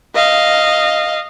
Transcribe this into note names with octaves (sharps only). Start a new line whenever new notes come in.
D#5 F5